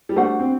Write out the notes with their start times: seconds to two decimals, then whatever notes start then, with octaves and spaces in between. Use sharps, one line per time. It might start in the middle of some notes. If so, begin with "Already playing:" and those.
0.09 G3
0.16 A3 D4 F#4 C5 F#5
0.40 C4